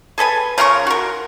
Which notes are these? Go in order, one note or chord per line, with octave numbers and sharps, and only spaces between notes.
G#4 A4 B4 G#5
C#3 F4 A#4 C#6
F#4 A#4